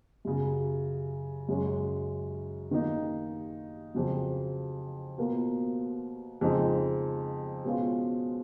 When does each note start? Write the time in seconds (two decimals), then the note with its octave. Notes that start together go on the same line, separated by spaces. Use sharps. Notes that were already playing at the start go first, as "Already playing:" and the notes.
0.25 F#2 C#3 F#3
1.49 F#2 C#3 G#3 C#4
2.71 D#3 A#3 D#4
3.94 F2 C#3 F#3
5.18 B2 A#3 F4 A#4
6.41 F2 C#3 F3 G#3 D#4
7.64 B2 G#3 C#4 F4